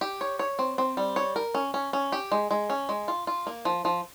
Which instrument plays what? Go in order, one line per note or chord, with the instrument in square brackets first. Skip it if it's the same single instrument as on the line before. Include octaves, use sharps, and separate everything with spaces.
[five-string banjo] G4
C#5
C#5
C4
C4
G3
C#5
A#4
C#4
C#4
C#4
G4
G#3
G#3
C#4
G#3
F4
F4
A#3
F3
F3